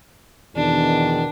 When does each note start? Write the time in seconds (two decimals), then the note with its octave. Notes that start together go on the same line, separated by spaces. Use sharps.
0.56 E2 B2 D#3 D4